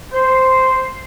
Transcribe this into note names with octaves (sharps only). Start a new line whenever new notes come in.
C5